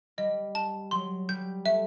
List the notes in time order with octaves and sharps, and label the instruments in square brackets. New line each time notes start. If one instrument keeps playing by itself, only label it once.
[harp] G3 [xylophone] D#5
[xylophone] A5
[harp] F#3 [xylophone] C6
[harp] G3 [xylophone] G6
[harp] A3 [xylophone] E5